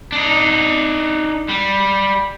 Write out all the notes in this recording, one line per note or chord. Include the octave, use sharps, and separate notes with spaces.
D4 D#4
G3